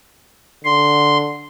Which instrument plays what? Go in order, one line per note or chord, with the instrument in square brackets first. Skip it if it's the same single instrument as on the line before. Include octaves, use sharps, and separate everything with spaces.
[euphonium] D3 [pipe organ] C6